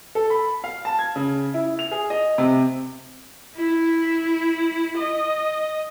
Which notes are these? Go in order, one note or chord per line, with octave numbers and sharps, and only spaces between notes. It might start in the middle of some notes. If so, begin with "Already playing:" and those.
A4
B5
F5
A5
G#6
C#3
E4
F7
G#4
D#5
C3
E4
D#5